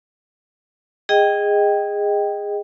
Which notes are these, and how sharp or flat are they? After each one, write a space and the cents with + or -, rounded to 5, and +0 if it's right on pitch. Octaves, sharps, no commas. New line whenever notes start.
G#4 -15 D#5 +0 G5 +0